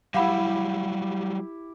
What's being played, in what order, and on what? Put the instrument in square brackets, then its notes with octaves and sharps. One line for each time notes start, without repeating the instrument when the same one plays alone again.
[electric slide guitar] F#3 G3 [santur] E4 G4 [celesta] F5 F#5 B5